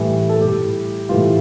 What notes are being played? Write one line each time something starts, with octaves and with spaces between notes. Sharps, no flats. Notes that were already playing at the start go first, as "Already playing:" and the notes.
Already playing: A2 E3 G3
A4
A2 G3 G4
A2 E3 G3 F4